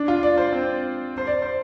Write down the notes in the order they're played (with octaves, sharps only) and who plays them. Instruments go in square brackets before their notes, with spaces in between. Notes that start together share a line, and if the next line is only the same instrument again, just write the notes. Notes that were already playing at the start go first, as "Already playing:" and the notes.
Already playing: [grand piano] D4
F4
D5
C5
C4
C5
D5
C5